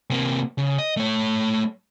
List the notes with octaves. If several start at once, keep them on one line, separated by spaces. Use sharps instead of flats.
C3 A#3
C#3
D#5
A3 C#5